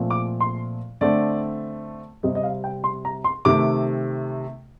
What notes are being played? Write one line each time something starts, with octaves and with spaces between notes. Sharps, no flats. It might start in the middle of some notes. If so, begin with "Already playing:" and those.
Already playing: A#2 F3 A3 C4
D6
C6
D3 A3 C4 D5
C3 G3 C4 D#5
D#5
F5
G5
C6
A#5
C6
C3 D#3 A3 D6